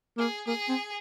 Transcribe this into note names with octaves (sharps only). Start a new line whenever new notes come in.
A#3 G#4
A#3 G#4
C4